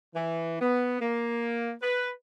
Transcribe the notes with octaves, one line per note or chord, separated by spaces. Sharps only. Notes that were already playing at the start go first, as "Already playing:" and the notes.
E3
B3
A#3
B4